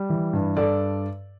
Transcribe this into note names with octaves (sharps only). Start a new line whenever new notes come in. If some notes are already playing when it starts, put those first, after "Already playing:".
Already playing: G3
E3
G2
G2 A4 D5